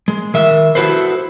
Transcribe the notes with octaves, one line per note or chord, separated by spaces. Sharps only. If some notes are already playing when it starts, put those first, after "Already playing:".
G#3
D#3 E5
E4 F#4 G4 A4 B4 C5